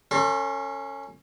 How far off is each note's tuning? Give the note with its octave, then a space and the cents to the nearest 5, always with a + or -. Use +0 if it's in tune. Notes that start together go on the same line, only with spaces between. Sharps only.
C#4 +0 A4 +45 C6 +35